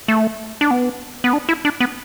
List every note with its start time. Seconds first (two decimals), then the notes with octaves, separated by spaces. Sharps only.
0.08 A3
0.61 D4
0.71 B3
1.24 B3
1.33 D4
1.49 E4
1.65 D4
1.80 B3